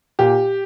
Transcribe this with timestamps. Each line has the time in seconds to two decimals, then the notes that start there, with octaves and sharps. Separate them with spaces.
0.19 A#2 G4